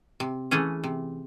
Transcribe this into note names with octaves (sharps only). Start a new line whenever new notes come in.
C3
E3 A3 C#4 G#4
C3